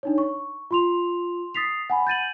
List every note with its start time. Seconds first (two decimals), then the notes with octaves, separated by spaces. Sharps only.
0.03 D4 D#4 C#5
0.18 C#6
0.71 F4 C6 F7
1.55 D#6 A6 B6 C7 F7
1.90 F#5 G#5 B5
2.07 G6 A6 D#7 F#7